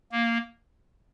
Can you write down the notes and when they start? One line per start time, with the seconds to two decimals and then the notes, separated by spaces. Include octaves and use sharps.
0.12 A#3